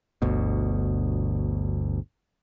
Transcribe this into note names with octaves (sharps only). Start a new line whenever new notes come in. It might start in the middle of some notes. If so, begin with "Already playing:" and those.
G1 D2 B2